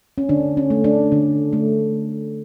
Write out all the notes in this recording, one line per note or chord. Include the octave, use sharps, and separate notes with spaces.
C#4
D3 D4
C#4
A3
D4
D3
A3